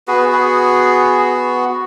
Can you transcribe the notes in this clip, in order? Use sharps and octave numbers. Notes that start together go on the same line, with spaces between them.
B3 F#4 G#4 B4
G#4